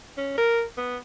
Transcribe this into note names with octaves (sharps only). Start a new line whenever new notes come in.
C#4
A#4
B3